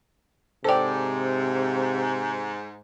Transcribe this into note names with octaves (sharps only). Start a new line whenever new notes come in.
G#2 C3 A4 C5 D5 G5